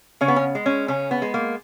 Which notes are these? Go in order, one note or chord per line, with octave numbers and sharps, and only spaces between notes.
C#3 C#4
B3
C#4
G#3
C#4
C#3 C#4
B3
G#3
A#3